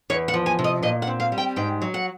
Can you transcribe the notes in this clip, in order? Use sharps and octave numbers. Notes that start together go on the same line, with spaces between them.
E2 C#5
F#5
F3
G#5
C3
D#5
A#2 D#5
F#5
C4
F5
G3
G5
G#2 G5
F#3
F#5